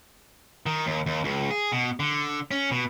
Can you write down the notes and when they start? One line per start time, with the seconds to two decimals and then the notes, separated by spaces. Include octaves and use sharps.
0.66 D#3
0.87 D#2
1.06 D#2
1.24 C#2
1.50 G#4
1.72 B2
2.00 D3
2.51 C#4
2.71 B2